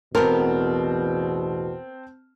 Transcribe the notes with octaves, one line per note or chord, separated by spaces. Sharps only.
A1 E2 B2 B3 C4 A#4 A5 F6